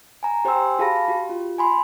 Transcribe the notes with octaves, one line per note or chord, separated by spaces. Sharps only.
G#5 A#5
G4 C5 G5 G#5 C6 E6
F#4 G#4 F5 A5 B5 A#6
F#4 G4
F4
G#5 B5 C6